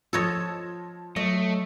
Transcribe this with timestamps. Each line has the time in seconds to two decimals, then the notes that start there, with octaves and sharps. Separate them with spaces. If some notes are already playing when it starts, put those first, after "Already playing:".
0.13 F3 A4 C#5 D#5 G#6 E7
1.16 F#3 A3 D#5